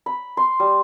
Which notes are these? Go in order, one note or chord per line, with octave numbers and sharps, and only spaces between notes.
B5
C6
G3